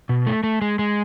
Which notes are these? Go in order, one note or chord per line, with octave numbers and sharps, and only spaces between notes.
B2
A3
A3
G#3
G#3